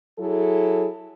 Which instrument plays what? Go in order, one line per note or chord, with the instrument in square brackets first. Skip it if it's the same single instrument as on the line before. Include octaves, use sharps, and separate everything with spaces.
[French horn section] F#3 E4 G#4 A4